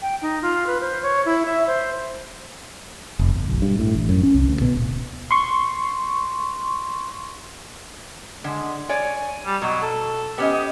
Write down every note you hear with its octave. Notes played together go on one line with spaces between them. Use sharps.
G5
D#4
F4
B4
C5
C#5
E4
E5
C5
F1
G1
B1
G2
A2
A1
F#2
C#4
C2
D2
B2
D1
C6 C#6
D3 G#3
C#5 D5 G#5
G3
B2 F#3
A4
B3 C#4 G4 D#5